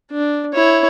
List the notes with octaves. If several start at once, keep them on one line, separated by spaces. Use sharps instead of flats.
D4
E4 C#5